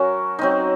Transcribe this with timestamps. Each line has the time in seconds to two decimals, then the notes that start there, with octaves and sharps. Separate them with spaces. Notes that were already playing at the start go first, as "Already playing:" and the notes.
Already playing: F#3 C#4 F#4 A#4
0.39 F#3 C4 D#4